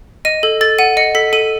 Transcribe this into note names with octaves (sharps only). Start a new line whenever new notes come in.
D#5 D#7
A4
A4 A6
F#5 D#7
D#5 C#7
A4 B6
A4 D#7